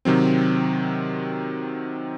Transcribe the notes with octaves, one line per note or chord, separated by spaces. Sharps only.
C3 D#3 F#3 C4